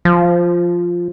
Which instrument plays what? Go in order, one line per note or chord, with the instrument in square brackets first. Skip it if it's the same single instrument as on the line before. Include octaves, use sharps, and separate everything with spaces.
[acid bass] F3